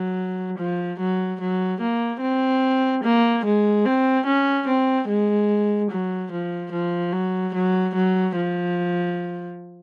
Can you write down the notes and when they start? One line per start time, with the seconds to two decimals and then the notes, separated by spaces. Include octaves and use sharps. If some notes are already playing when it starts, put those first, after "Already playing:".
Already playing: F#3
0.58 F3
0.99 F#3
1.40 F#3
1.81 A#3
2.21 C4
3.04 A#3
3.45 G#3
3.85 C4
4.26 C#4
4.67 C4
5.08 G#3
5.91 F#3
6.31 F3
6.72 F3
7.12 F#3
7.54 F#3
7.95 F#3
8.36 F3